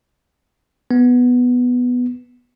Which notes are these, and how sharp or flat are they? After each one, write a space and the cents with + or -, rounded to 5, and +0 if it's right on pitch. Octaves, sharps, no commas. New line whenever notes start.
B3 +0